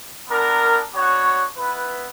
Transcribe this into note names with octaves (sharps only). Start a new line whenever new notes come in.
B3 D4 A#4
B3 D4 F#4 C#5 F#5
B3 E4 B4